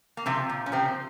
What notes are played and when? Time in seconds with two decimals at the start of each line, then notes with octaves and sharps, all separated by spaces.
0.17 A#3
0.26 C3 F3 C4
0.49 A#2
0.66 C#4
0.72 C3 F3 C4